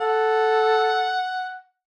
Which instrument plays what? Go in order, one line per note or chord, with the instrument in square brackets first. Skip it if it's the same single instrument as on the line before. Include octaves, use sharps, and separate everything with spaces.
[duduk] A4 [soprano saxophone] F#5